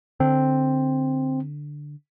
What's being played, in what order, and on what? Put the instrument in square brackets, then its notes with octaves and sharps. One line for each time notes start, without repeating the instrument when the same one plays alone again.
[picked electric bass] D3 [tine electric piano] C4